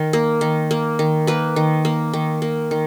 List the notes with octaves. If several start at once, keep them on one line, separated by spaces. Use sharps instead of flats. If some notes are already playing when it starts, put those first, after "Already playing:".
Already playing: D#3 A#4
A#3
D#3
A#3
D#3
A#3 B4
D#3
A#3
D#3
A#3
D#3